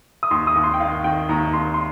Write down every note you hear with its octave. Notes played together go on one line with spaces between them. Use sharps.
D#6
D#2 C6
D#6
D#2
C6
G5
D#3 F5
D#3 G5
D#2 A#5
D#2 C6
C6